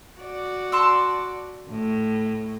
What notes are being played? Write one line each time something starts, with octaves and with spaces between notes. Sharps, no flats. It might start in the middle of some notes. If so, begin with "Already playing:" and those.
F#4 D5
A5 C6 E6
A2